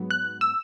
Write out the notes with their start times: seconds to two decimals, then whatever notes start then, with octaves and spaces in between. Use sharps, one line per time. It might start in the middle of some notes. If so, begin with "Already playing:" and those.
Already playing: G#2 F#3 B3
0.11 F#6
0.41 E6